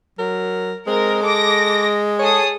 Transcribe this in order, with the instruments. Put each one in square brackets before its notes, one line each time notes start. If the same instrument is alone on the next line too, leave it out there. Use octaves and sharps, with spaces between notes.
[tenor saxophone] F#3 [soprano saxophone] A#4
[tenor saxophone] G#3 [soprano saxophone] C4 [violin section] A#4
[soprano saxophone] A4 [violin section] D6 A#6
[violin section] G#4 A4 D#6 [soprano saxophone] C#5